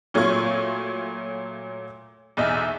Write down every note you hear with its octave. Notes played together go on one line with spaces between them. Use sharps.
A#2 F#3 A3 F4 C#6 G#6
B1 E2 D#5 E5